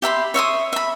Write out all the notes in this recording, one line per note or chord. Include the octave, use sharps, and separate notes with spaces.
G4 E5 B5 C6
C#5 E5 C6 D#6
E5 B5